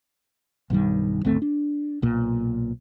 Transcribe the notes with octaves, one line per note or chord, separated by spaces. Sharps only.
B1 G2 D#3 G3
G#1 D2 A3 C4
D4
B1 A#2